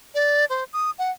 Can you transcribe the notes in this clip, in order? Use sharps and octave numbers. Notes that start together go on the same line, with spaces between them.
D5
C5
D#6
F#5